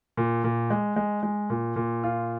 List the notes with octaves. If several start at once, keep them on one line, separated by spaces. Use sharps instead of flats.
A#2
A#2
G#3
G#3
G#3
A#2
A#2
F4